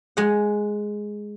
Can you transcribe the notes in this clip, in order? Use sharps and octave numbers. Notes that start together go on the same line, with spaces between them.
G#3 F#5